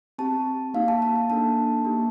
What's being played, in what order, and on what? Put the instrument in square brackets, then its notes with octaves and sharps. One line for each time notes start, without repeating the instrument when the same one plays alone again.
[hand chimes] C4 G4 A5
A#3 D#4 G4 F5
A5
A5
A5
A#3 D4 A4 A5
A#3 D#4 G4